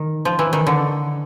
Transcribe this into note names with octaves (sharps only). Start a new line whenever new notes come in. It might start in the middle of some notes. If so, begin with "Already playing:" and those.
Already playing: D#3
F3
E3
D#3
D3